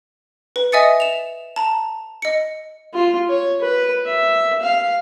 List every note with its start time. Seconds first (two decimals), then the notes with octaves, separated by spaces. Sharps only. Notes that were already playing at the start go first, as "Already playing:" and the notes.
0.56 B4
0.72 D#5 E5 G#5 D#6 A6 C#7
1.00 E7 F7
1.56 A5 A#5
2.22 D#5 C#7
2.94 F4
3.29 C#5
3.61 B4
4.06 E5
4.62 F5